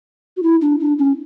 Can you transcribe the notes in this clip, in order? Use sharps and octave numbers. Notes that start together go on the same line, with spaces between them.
F#4
E4
D4
D4
C#4